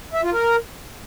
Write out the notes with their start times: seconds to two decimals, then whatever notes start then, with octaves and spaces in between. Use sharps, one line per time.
0.14 E5
0.23 F4
0.32 A#4